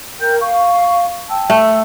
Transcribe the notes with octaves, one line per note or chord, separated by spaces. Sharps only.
A#4 G5 G6
F5 C#6
G5 A5 E6
A3